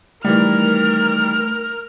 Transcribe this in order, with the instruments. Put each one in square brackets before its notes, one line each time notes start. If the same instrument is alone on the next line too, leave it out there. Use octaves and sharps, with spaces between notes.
[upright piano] D#3 E3 G3 [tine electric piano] A3 [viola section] A#4 [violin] F6